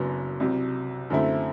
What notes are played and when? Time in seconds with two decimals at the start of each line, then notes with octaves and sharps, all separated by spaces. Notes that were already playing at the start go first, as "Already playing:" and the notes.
Already playing: F#1 F#2 F#3 B3 D4
0.40 C2 C3 F#3
1.10 F#2 D3 A3 C4 E4